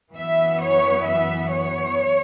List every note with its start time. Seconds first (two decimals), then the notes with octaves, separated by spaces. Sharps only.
0.14 F#2 E3 B3 E5
0.60 C#5
1.05 E5
1.51 C#5